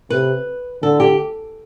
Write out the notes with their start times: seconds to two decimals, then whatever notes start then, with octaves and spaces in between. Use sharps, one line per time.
0.10 C3 B4
0.83 D3 A4
1.00 G4